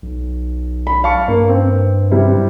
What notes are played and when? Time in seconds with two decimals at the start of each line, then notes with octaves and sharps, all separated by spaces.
0.02 B1
0.87 B5
1.04 F5 A5 C#6
1.28 G2 A#3
1.49 C4
2.11 C3 G3 E4